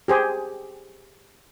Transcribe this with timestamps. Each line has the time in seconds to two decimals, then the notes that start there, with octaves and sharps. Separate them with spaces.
0.08 G4 G#4 C5